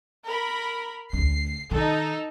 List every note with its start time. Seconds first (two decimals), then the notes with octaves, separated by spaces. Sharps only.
0.25 A#4 B5
1.13 D2 D4 C7
1.71 D#3 D#4 A4